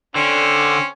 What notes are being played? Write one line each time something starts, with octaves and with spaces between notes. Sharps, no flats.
D3 C4 C#4